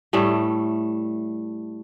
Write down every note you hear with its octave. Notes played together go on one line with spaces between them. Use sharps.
A2 G3 A3